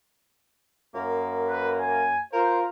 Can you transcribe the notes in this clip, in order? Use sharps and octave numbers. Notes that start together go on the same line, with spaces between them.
F#2 A#3
B4
G#5
F4 A#4 C5